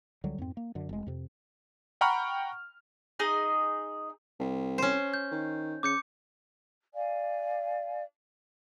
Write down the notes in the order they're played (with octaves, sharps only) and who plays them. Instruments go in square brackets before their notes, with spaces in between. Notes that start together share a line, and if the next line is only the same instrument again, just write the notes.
[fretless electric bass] C#2 D3 F#3 G3
F2 G#2 C4
A#3
F#2 D3
F1 G#3
F2 C3
[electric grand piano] F#5 G5 A#5 B5 C#6 F6
[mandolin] D#4 G#4 D#5
[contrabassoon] C2
[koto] C#4 C5
[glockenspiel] G6
[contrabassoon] D#3
[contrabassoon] C#3 [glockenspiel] D6 G6 C#7
[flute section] D5 F5 G#5